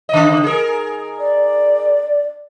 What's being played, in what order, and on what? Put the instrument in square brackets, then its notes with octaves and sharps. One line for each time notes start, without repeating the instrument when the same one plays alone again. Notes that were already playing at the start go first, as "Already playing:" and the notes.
[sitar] C#3 D#5
G#4 A#4
[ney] D5